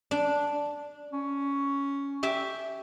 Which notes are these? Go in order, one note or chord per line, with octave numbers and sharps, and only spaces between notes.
D4
C#4
G4 E5 G5